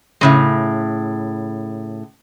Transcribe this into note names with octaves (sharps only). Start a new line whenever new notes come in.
A2 C#3 G#3